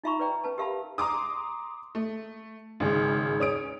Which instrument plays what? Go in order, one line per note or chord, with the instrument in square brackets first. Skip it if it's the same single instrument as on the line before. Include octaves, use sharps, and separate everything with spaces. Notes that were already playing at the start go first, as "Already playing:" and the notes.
[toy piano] D#4 F4 E5 A#5 B5 C#6
B4 C#5 D5 G5 A#5
C#4 B4 A5
G4 A#4 E5 F5 A5 B5
[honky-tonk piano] A#5 C6 D6 D#6
A3
G#1 C#3 G#3
C#4 D#6 D7